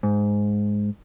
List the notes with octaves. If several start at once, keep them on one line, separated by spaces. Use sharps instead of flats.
G#2